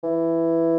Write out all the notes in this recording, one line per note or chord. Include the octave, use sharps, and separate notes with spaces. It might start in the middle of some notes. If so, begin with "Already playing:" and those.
E3